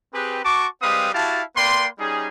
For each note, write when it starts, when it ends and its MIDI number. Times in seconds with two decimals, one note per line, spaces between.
0.13 0.39 60
0.13 0.39 67
0.13 0.39 68
0.13 0.39 71
0.43 0.66 66
0.43 0.66 81
0.43 0.66 85
0.43 0.66 86
0.81 1.09 55
0.81 1.09 56
0.81 1.09 60
0.81 1.09 71
0.81 1.09 77
0.81 1.09 87
1.13 1.41 64
1.13 1.41 66
1.13 1.41 67
1.13 1.41 77
1.13 1.41 81
1.56 1.87 58
1.56 1.87 71
1.56 1.87 74
1.56 1.87 79
1.56 1.87 84
1.98 2.28 55
1.98 2.28 61
1.98 2.28 63
1.98 2.28 68